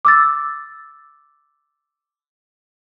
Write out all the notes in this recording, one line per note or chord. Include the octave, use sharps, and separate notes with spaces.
D6 E6 A6